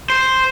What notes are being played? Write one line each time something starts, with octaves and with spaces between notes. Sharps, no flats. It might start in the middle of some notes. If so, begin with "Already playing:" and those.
C5